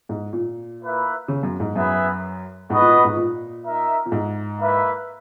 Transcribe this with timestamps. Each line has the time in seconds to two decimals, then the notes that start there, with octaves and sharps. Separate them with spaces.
0.09 G#2
0.33 A#2
0.81 A#3 E4 B4 E5
1.28 C#3
1.43 F#2
1.60 G#2
1.75 F#2 B3 E4 G#4 B4 E5
2.70 G#2 B3 F#4 B4 D#5
2.81 A#2
2.93 A#2
3.05 G#2
3.16 A#2
3.65 D#4 A#4 E5
4.06 A#2
4.12 G#2
4.59 A#3 E4 B4 E5